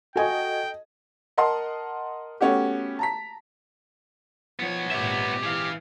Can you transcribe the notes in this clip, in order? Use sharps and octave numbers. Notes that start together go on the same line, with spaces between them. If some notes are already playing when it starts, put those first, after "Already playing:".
F#4 A4 D#5 G5 G#5
A#4 D#5 F#5 A5 C6
A3 B3 C#4 F#4 G4
A5 A#5 B6
F3 B3 C#5
G#1 A#2 G4 E5
E3 G#4 F5